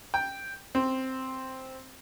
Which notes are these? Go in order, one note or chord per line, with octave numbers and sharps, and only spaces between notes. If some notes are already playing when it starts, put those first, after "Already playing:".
G5
C4